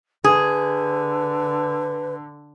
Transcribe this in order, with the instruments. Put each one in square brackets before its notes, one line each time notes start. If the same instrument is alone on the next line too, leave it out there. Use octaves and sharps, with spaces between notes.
[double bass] D3 [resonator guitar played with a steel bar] G#4 [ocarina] B4